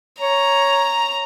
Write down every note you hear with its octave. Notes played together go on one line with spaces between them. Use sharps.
C#5 A#5